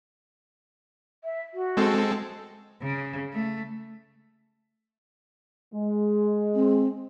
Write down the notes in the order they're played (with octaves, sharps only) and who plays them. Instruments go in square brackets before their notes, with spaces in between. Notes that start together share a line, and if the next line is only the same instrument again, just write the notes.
[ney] E5
F#4
[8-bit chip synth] G#3 C4 A4
[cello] C#3
A3
[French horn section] G#3
[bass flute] C4